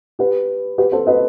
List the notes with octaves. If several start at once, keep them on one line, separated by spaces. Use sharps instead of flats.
G4 B4
G4 B4
A4 C5
B4 D#5